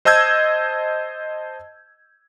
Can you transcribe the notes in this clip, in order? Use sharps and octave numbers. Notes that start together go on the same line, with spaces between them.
C5 D#5 A5 E6 G6 G#6